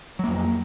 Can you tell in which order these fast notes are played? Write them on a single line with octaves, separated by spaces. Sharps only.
F#3 A#3 F2